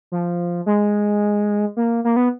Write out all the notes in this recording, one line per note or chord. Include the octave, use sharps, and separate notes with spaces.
F3
G#3
A#3
A#3
B3